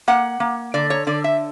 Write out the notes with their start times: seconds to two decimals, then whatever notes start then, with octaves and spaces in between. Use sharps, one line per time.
0.08 A#3 F#5
0.40 A#3
0.74 D3 D5
0.90 C#5
1.07 D3 D5
1.24 E5